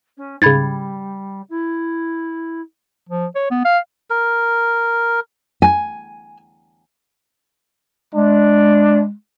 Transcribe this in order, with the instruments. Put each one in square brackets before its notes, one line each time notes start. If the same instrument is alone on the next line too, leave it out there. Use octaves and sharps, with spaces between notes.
[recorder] C#4
[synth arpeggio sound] G#2 C#3 [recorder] G3 [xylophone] B5 G#6 A6
[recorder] E4
[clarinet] F3
C#5
B3
F5
[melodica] A#4
[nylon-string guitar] G#5
[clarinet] G#3 [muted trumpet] D4